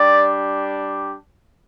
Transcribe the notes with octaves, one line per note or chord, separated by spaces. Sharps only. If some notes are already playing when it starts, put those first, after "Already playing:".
Already playing: G3 D4 G4 D5